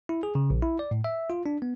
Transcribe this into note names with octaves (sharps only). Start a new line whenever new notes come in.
E4
G#4
C#3
A#1
E4
D5
A2
E5
F4
D4
B3